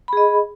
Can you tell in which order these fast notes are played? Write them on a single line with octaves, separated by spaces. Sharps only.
B5 G#4 D#5